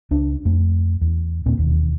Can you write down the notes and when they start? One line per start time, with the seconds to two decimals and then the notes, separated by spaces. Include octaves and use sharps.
0.11 C#2 D4
0.45 F2 A3
1.01 E2
1.46 D#2 A#2 A#3 C4
1.57 E1 D#2